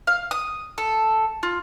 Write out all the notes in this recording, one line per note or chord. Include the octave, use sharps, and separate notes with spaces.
F5
D#6
A4
F4